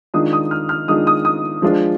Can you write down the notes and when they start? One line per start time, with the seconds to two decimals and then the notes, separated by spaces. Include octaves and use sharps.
0.14 D#3 G#3 D4 F4 D#6
0.33 D#6
0.51 F6
0.69 F6
0.88 D#3 G#3 D4 F4 D#6
1.07 D#6
1.25 D#6
1.62 F3 G#3 D4 F4